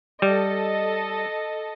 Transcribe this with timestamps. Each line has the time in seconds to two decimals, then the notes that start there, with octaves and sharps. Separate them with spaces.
0.22 G3 A4 D#5